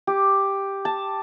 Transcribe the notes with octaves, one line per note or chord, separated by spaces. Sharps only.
G4
A5